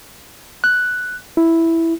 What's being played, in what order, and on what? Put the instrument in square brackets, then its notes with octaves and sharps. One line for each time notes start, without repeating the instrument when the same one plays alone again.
[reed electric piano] F#6
E4